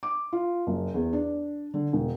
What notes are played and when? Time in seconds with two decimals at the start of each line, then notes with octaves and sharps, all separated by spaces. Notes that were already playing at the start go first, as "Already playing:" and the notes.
0.03 D6
0.33 F4
0.67 F#1
0.94 E2
1.13 D4
1.74 D3
1.93 E1